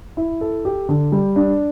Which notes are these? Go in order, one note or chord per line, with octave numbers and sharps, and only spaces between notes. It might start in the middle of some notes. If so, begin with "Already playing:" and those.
E4
A4
G4
D3
G3
D4